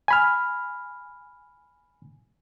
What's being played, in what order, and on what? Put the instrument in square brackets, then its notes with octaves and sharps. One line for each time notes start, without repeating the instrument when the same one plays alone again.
[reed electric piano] G#5 B5 F6